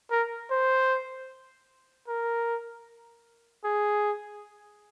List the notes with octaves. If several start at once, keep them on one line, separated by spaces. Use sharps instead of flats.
A#4
C5
A#4
G#4